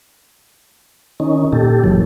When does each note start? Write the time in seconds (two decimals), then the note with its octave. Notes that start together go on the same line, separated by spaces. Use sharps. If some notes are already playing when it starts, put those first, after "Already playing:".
1.20 D#3 C#4 D#4
1.53 A#2 G4 A4
1.84 F#1 G2 A#2 E3 F#3